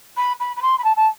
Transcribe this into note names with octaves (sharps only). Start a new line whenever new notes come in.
B5
B5
B5
C6
B5
A5
A5